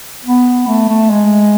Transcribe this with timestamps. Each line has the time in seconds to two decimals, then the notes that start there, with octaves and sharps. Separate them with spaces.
0.25 B3
0.67 A3
0.88 A3
1.10 G#3